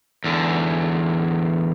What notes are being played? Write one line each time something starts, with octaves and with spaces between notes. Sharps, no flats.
E2 D3